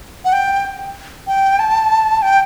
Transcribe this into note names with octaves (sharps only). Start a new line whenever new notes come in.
F#5
G5
G5
A5
G5